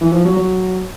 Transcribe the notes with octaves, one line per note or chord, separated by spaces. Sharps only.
E3
F3
F#3
F#3